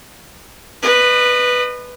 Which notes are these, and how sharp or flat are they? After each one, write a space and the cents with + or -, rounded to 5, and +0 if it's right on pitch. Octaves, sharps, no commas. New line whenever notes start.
B4 +0 D#5 -35